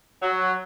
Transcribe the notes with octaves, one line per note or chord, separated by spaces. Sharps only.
F#3